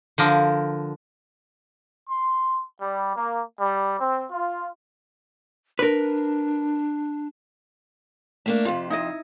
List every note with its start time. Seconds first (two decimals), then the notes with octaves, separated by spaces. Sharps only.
0.18 D3 F3 A#4
2.09 C6
2.81 G3
3.16 A#3
3.59 G3
3.99 C4
4.31 F4
5.79 D4 A#4 B4
8.46 A3 A#3 D4
8.65 F2 C3 F4
8.90 D#4 E4 D#5